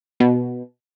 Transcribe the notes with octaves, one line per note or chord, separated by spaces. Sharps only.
B2